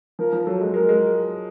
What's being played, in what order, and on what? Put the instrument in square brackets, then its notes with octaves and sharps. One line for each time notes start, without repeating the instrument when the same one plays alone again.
[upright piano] F3 [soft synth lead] A#4
[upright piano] F3
[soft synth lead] A#4
[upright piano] F#3 [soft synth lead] A4
[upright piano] G#3
[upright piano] G#3 [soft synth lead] A#4
[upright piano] G#3